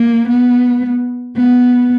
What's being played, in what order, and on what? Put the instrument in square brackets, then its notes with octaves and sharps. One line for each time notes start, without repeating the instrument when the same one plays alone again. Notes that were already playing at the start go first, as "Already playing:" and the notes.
Already playing: [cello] A#3
B3
B3